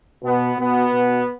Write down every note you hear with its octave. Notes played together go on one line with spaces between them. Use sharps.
B2 B3
B2 B3
B2